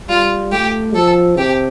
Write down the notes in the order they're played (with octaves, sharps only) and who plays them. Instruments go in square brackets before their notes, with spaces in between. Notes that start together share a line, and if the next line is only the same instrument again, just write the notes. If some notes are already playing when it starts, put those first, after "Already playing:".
[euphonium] G3 [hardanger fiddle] F4
[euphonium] A3 [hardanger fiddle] G4
[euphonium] F3 [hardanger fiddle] A4
[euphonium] C3 [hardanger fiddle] G4